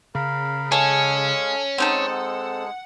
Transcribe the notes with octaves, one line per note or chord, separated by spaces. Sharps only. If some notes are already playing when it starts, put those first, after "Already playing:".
C#3 A#4 F5 B5
G#3 C#4 A4 F5 G#5
G#3 C4 D#4 A4 F#5